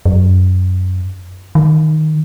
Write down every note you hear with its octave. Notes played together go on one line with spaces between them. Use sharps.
F#2
D#3